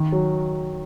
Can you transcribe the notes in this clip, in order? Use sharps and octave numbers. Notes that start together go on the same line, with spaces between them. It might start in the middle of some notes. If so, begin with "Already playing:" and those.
Already playing: D#3
F#3